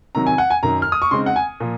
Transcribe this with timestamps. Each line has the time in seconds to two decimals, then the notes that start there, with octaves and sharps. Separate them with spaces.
0.15 C3 D#3 F#3 A#5
0.27 G#5
0.38 F#5
0.50 G#5
0.63 F#2 D#3 F#3 A#5
0.82 F6
0.92 D#6
1.02 C#6
1.11 C#3 G#3 C4 D#4 C6
1.26 F#5
1.36 G#5
1.60 A#2 F3